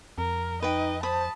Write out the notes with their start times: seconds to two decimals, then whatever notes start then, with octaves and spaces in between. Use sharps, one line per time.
0.18 F2 A#4
0.62 D#4 B4 D#5 G5
1.03 C5 A5 B5 D#6